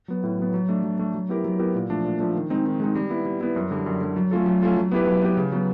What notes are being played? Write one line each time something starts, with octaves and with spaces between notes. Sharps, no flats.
F#3 B3
A2
F#3 B3
F#3
A3 D4
F#3
A3 D4
F#3
B3 E4 G4 A#4
F#3
B3 E4 G4 A#4
A#2
F3 A3 D4
A#2
F3 A3 D4
D#3
G#3 C4 D#4
D#3
G#3 C4 D#4
G3
B3 E4
G3
B3 E4
F#2
D3 G3
F#2
D3 G3
F#3
A3 C#4 F4 A4
F#3
A3 C#4 F4 A4
F#3
B3 E4 G4 B4
F#3
B3 E4 G4 B4
C#3
F#3 B3